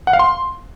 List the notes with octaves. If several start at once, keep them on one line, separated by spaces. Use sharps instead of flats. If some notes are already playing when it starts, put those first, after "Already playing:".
F#5
F5
C6